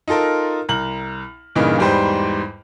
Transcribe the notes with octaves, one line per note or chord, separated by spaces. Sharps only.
D#4 F4 A4 A#4
C2 A#5 F6 F#7
G2 A#2 C#3 E3 D#4
E2 G#2 G3 B4 C5 G5